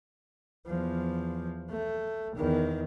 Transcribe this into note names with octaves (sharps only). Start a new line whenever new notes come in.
E2 F3
A3
E2 D#3